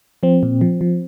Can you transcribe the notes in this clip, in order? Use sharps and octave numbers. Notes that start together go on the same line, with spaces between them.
F3 C4
A#2
F3
F3